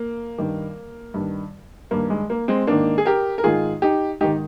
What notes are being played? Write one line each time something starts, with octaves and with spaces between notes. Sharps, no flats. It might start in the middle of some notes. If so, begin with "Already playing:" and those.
Already playing: A#3
G2 D#3
G2 D#3
G2 D#3 A#3
G#3
A#3
G#3 C4
G#2 D#3 A#3 D4
G#4
G4 A#4
A#4
G#2 D#3 F4 G#4
D#4 G4
G#2 D#3 D#4 G4